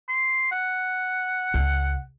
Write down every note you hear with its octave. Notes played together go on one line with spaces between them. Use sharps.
C6
F#5
C#2